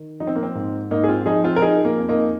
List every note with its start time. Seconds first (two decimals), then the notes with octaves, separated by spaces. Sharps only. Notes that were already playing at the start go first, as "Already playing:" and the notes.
Already playing: D#3
0.20 F3 D#4
0.27 C4
0.36 A#3
0.43 C4
0.55 G#2
0.91 G#2 A#3 D#4
1.04 G#4
1.08 C4 F4
1.26 F3 D#4 G#4
1.44 C4 F4
1.56 A#4
1.62 F3 D#4 G#4
1.85 A#3
1.97 F2
2.09 A#3 D#4